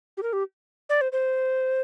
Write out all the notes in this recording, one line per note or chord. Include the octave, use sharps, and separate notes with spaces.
G4
A#4
G4
D5
C5
C5